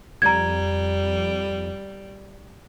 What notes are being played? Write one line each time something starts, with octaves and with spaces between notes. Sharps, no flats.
F2 G3 A#5 G#6